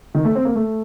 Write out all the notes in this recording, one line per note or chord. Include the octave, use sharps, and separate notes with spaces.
D#3
A3
C4
A#3
A3